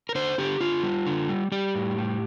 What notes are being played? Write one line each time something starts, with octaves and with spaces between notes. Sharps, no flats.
A#4
D3 C5
D3 G4
D3 F4
G3
D3
G3
G3 G4
A2
G3